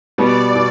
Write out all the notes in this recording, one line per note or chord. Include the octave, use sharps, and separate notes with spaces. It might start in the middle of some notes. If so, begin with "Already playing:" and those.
B2 G3 B3 D5
B2